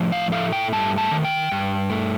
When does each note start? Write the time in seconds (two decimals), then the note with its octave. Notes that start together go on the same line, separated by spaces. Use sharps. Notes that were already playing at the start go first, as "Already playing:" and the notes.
Already playing: A2 F3
0.12 F5
0.32 A3 F5
0.53 G5
0.72 G2 A5
0.98 A5
1.11 D#3
1.24 G5
1.52 G2
1.90 A3